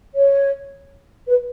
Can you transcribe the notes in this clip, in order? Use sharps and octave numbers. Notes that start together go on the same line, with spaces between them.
C#5
B4